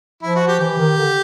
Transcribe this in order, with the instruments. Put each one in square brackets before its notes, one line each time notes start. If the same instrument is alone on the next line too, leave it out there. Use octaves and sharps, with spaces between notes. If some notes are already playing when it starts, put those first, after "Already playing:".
[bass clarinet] F3 [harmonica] E4
[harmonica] F#4
G4
[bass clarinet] E3 [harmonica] G4
[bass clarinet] D#3
D3